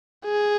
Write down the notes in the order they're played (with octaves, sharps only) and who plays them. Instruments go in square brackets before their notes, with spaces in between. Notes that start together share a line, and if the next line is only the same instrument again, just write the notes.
[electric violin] G#4